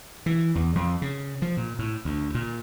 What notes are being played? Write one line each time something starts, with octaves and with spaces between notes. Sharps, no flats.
E3
E2
F2
C#3
F3
A#2
A2
D2
A#2